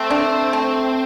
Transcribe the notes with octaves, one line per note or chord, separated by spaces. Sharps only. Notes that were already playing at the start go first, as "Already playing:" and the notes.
Already playing: A3 C4
D4
A3